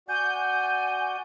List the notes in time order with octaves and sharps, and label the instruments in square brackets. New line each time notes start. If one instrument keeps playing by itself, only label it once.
[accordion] F#4 D5 F#5 [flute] G#5 [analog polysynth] G6